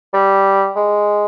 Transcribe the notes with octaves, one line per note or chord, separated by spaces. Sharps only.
G3
G#3